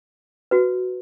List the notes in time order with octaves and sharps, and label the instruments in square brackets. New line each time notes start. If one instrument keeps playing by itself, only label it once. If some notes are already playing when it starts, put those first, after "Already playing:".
[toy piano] F#4 B4